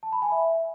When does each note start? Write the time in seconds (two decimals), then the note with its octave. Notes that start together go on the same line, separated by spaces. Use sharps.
0.03 A5
0.12 B5
0.22 G#5
0.32 E5